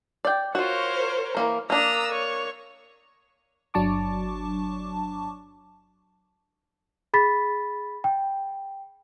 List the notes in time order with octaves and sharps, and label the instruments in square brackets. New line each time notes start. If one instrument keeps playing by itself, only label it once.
[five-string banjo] D5 G5
[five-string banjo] F4 F#4 [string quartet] A#4 C5 C#5
[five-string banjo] E3 A#3 A#5
[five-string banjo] A#3 D4 [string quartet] A#5 D#6 E6
[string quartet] C#5
[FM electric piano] G1 F#3 D4 A5 C#6 D6
[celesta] G#4 B5 A6 B6
G5